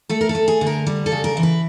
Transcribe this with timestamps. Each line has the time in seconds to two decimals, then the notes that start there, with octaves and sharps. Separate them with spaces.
0.09 A3 A4
0.21 A#4
0.29 A4
0.35 A3
0.48 G#4
0.61 D3
0.66 A#4
0.86 G3
1.06 A4
1.12 C#3
1.24 A#4
1.37 E3
1.43 B4